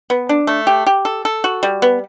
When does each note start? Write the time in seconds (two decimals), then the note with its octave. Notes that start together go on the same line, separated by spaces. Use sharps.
0.10 B3
0.29 D4
0.47 A3
0.67 G4
0.87 G4
1.05 A4
1.25 A4
1.44 F#4
1.63 G3
1.82 B3